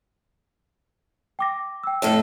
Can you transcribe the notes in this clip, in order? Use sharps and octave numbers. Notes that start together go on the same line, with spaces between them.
G5 D6 A#6
G5 E6
F2 A2 A4 C#5